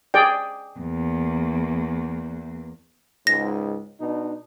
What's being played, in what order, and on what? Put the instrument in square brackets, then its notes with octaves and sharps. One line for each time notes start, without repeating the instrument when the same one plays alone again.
[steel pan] G#4 D5 G5
[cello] E2 A#3
[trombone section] C#2 G#2 [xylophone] A#6
[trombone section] B2 D4 D#4